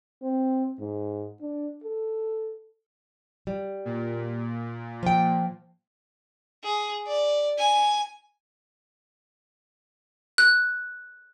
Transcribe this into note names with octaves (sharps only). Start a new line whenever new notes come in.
C4
G#2
D4
A4
G3
A#2
F3 G5
G#4
D5
G#5
F#6